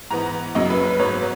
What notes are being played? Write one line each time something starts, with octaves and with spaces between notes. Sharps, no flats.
G#2 E3 B3 A#5
F#2 C#3 F#3 A#3 D#5
B4
B4
G#2 F#3 B3 C#5